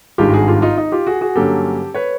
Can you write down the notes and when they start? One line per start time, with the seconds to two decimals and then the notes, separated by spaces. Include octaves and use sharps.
0.18 G#1 G2 D#3 G#3 F4 G4
0.33 F#4 G#4
0.47 F4 G4
0.62 D#4 F4
0.77 D#4
0.92 F4 G4
1.07 F#4 G#4
1.21 F#4 G#4
1.36 G2 D3 F#3 A#3 C#4 G4 A4
1.94 B4 C#5